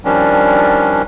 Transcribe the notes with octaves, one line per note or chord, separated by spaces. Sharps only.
D#3 F3 G3 C#4 D4